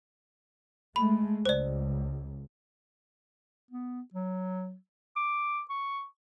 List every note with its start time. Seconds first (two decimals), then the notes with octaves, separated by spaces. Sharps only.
0.96 G#3 A3 B5
1.46 C#2 C5 D5
3.71 B3
4.14 F#3
5.16 D6
5.69 C#6